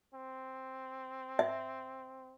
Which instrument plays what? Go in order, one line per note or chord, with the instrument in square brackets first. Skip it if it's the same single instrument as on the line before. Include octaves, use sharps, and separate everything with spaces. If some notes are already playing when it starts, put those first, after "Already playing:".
[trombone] C4
[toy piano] E5